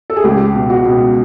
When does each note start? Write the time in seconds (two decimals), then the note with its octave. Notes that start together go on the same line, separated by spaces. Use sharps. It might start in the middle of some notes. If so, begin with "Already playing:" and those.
0.10 A4
0.17 G#4
0.24 C#2 G4
0.55 B2
0.70 F#4
0.85 B2